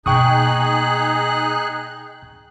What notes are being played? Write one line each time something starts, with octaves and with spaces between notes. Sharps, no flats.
B2 A#3 D#4 G#4 G5 C#6 D#6 F#6